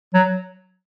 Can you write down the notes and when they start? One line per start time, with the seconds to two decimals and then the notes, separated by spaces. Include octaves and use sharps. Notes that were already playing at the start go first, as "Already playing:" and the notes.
0.14 F#3